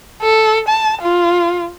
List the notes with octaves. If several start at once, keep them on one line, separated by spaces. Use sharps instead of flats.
A4
A5
F4